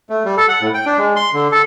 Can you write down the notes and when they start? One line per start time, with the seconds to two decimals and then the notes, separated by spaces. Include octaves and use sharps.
0.10 A3
0.25 G3
0.37 A4
0.48 F#5
0.61 A2
0.74 G5
0.86 D4
0.98 G#3
1.16 C6
1.33 D3
1.52 A4